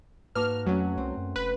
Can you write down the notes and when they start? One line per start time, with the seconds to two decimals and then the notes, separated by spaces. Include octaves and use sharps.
0.35 G#2 A#3 F#4 A#4 B4 A5 D6 F6
0.66 F2 F#3 A3 C#4 F#5
0.97 C2 C4
1.17 F#2
1.36 F1 B4